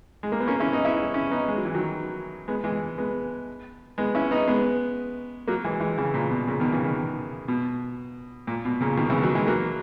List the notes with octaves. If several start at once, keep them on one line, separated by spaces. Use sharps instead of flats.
G#3
A#3
B3
A#3 C#4
C#4 E4
B3 D#4
C#4 E4
C#4 E4
B3 D#4
G#3
F#3
E3
D#3 F#3
G#3 B3
E3 G#3
G#3 B3
G#3 B3
C#4 E4
B3 D#4
G#3 B3
F#3 A#3
E3 G#3
E3 G#3
C#3 E3
A#2 C#3
B2
A#2 C#3
B2 D#3
C#3 E3
B2 D#3
B2
A#2
B2
A#2 C#3
B2 D#3
C#3 E3
D#3 F#3
E3 G#3
F#3 A#3